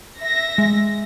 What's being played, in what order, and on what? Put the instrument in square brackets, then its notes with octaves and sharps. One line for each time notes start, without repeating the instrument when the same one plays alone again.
[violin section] E5 A#6
[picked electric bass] G#3